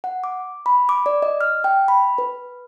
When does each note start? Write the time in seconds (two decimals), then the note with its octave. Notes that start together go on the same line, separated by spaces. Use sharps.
0.04 F#5
0.24 D6
0.66 B5
0.89 D6
1.06 D5
1.22 D#5
1.41 F6
1.64 G5
1.88 B5
2.18 B4